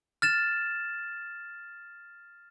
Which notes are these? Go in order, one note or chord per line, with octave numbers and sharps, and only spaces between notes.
F6 A6 E7